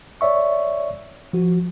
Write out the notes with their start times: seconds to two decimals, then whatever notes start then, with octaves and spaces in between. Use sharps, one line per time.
0.21 C#5 D5 E5 C#6
1.33 F3 F#4